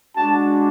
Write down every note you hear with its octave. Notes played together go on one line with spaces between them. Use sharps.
G#3 D4 F#4 A5